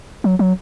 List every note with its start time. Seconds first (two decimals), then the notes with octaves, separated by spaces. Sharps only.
0.24 F#3
0.39 F#3